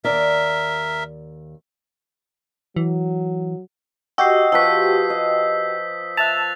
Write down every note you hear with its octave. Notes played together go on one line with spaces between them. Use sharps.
D#2 A#4 D5 E5
E3 F#3
F#4 G4 D#5 E6 G6 C7
F3 B4 C#6 E6 B6
D#5
E5 A5 F#6 A6 F7